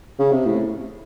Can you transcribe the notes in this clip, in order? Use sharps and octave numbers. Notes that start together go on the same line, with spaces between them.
C#3
C3
A2